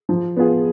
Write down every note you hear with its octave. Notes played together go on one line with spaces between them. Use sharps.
F3
B3 F4 G#4